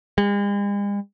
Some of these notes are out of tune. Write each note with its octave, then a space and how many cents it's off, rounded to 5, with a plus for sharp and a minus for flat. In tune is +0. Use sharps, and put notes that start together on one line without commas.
G#3 -45